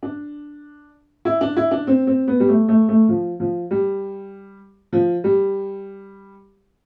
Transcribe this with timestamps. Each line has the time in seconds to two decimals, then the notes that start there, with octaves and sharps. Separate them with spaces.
0.03 D4
1.25 E4
1.41 D4
1.57 E4
1.71 D4
1.87 C4
2.07 C4
2.28 B3
2.40 G3
2.49 A3
2.68 A3
2.89 A3
3.09 F3
3.40 F3
3.71 G3
4.93 F3
5.24 G3